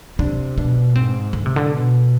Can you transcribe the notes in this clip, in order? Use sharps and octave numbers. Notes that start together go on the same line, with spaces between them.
C3 D4
B2 D4
G#2 C4
D3
C3
D3
B2